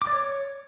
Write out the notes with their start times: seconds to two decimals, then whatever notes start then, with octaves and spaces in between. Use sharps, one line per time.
0.02 D6
0.07 D5
0.13 C#5